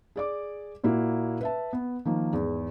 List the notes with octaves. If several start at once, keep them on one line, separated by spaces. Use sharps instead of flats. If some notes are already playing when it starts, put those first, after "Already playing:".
G#4 D5 D6
A#2 A#3 E4 F#4
B4 E5 A5
B3
D#3 F3 A#3
E2 G#2